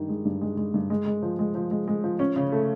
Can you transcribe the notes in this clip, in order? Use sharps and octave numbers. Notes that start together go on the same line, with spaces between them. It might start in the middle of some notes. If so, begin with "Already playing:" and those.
Already playing: G2 D#3
G#3
G2
G#3
G#3
G2
G#3
G#3
F3
G#3
F3
G#3
G#3
F3
C#4
C#3
A3